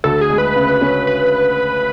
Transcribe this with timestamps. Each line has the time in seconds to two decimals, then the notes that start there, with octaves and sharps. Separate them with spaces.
0.04 D2 A4
0.21 G#4
0.30 G#3
0.38 B4
0.56 C#3
0.81 C#4
1.07 B4